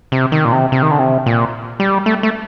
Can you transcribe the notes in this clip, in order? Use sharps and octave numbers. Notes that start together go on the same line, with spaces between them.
C3
D#3
A#2
C3
C3
D#3
D3
C3
A#2
G3
A3
A3